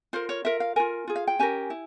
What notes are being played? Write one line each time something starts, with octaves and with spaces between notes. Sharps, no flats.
F4 A#4 C5
C#5
F4 A#4 E5
F5
F4 A#4 G#5
F4 G#4
F5
G5
C#4 G4 A#4 G#5
E4